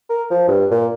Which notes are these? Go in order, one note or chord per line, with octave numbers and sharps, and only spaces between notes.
A#4
F3
G2
A#2